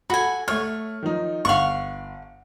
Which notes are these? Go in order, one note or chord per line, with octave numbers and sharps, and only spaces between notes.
F#4 A4 G#5 B5
A3 C#5 C#6 F6
D#3 F3 D#4
G1 F5 F#5 C#6